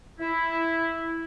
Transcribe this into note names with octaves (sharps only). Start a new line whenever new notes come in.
E4